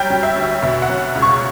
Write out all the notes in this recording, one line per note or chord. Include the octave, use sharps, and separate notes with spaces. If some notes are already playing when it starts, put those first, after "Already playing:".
Already playing: F#3 G3 G5
F#3
E5
D2
B2 E5
F#5
F#3
C#2
C#6